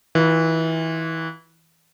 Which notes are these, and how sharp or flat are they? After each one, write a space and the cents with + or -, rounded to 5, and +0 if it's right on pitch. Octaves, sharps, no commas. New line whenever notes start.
E3 -25 F4 +0